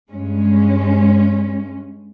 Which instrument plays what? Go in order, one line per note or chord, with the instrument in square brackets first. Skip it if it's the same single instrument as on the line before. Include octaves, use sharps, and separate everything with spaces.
[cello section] G2 G#3 C#4